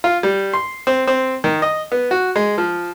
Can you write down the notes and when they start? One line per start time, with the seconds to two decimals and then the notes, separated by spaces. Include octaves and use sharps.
0.04 F4
0.23 G3
0.53 C6
0.87 C4
1.07 C4
1.44 D#3
1.62 D#5
1.92 B3
2.11 F#4
2.36 G#3
2.58 F3